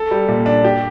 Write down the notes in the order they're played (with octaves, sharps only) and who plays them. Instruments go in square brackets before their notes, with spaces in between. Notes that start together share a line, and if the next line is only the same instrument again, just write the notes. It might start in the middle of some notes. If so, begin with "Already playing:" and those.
Already playing: [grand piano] A4
G3
A#2
D4
G4